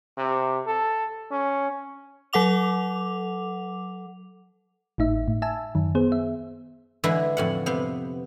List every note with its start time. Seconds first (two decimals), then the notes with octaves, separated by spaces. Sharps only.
0.18 C3
0.67 A4
1.31 C#4
2.33 F#3 A4 F#5 D6 F7
4.98 G#1 A2 D#4 E5
5.28 A2
5.42 E5 G#5 A5 E6
5.75 F#2 D#3
5.95 B3 G#4 C5
6.12 E5
7.04 D3 E3 G#3 E4 B4
7.37 F2 A2 F#5
7.66 C3 B3